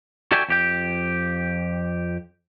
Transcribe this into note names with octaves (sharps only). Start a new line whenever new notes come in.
F#4 A4 D5 E5 G5 G#5
F2 G4 G5